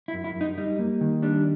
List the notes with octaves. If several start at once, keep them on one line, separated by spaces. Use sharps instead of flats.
E4
F#2
E4
F#2
D#4
G3 D#4
A#3
D#3
G3 D4